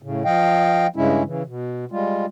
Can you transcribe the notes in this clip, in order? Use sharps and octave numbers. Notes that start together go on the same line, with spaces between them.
A2 C#3
F3 D#5 F5 G5
G2 C#3 G#3 C#4 E4
C#3 E3
B2
G3 G#3 F4